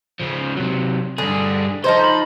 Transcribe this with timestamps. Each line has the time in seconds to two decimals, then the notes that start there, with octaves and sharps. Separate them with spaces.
0.20 C#3 F3
0.56 C3 F#3
1.18 G2 D3 G#4
1.84 F3 D#4 A4 C5 C6
2.04 B5